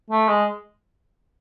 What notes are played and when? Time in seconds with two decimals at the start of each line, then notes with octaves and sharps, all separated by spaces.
0.10 A3
0.28 G#3